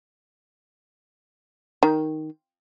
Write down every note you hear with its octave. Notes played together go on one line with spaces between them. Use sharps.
D#3